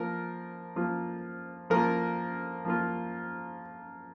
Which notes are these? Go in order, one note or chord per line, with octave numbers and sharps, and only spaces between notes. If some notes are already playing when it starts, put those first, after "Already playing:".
Already playing: F3 A#3 F4 A#4
F3 A#3 F4
F3 A#3 F4 A#4
F3 A#3 F4